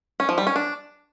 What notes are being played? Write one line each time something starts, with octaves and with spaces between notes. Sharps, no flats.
C#4
F3
G3
C#4
D4